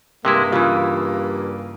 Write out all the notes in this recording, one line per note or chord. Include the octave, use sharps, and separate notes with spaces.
G2 C3 G#3 A#3 E4
C#3 E3 F4